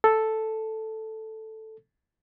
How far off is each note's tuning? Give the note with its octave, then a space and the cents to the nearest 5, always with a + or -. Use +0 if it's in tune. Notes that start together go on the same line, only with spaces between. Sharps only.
A4 +0